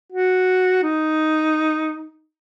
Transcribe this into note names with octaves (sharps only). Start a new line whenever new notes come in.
F#4
D#4